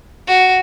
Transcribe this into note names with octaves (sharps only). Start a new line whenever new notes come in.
F#4